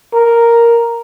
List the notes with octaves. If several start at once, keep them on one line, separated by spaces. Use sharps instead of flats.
A#4